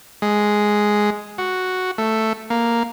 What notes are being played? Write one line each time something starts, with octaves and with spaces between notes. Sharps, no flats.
G#3
F#4
A3
A#3